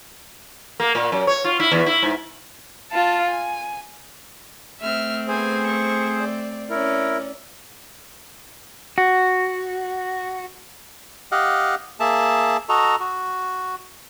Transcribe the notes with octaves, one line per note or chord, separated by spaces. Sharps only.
A#3
A#2
F#2
C#5
F4
E4
E2
E4
G#2
F4 A5
G#5
A3 C4 E5 F6
B3 G#4 C5 G#5
C#6
D5
C#4 E4 A#4 D5
F#4
G4 D#5 F5 F#5
A#3 G#4 E5 A5
F#4 A4 D#5 A#5
F#4